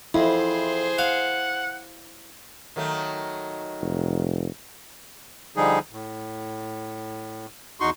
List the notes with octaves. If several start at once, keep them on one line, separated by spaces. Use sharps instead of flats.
F2 E4 G#4 C5
F5 F#5
D#3 F#3 A3
F1
D3 F3 G3 D#4 G#4
A2
E2 D#4 F#4 C6 C#6